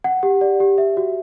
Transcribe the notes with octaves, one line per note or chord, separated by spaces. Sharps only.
F#5
G4
D5
G4
E5
F#4